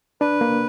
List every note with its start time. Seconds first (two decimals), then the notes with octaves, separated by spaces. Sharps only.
0.21 D4 B4
0.41 A#3